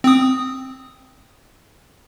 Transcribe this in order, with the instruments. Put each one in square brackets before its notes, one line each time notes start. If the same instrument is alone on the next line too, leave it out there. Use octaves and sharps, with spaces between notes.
[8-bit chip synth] C4 D#6